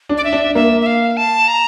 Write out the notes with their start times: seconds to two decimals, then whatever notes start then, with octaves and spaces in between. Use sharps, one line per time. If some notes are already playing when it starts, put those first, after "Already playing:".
0.09 D4
0.17 D5
0.24 E5
0.33 D4
0.55 A#3 E5
0.81 E5
0.86 F5
1.17 A5
1.48 A#5